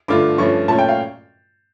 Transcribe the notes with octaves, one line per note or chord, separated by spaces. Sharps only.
G2 D3 A3 D4 F4 D6
G2 F3 A3 C#4 C#6
A#2 A3 C#4 A5
G5
F5